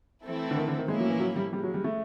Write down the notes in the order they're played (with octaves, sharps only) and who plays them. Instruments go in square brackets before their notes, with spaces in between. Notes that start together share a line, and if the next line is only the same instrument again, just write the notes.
[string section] E3 A3 C4 E4 A4
[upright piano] D3
D#3
D3
D#3
[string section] A2 F3 A#3 C#4 E4 [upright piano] G#3
[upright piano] F#3
E3
F#3
G3
[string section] C#3 F3 G#3 [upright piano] G3
[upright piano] F#3
G3
A3